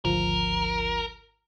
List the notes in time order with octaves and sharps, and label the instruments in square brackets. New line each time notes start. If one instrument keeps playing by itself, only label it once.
[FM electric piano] G#1 D2 F3 [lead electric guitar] A#4